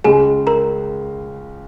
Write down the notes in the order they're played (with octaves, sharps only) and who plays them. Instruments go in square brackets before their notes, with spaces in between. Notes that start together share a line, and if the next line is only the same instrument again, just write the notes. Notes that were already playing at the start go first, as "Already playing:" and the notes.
[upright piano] C#2 C#3 G#3 [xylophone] G#4 G#5
[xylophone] A#4 A#5